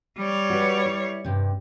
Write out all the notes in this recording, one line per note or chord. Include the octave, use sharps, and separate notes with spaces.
G3 C#5
F#4 B4
E4
G2 C3